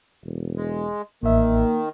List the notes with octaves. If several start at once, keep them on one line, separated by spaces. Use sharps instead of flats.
E1
G#3
A1 D#3 A#3 E5